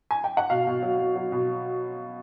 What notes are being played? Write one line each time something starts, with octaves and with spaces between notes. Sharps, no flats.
G#5
G5
F#5
B2 F5
B2
F#3
F#3
F#3
B2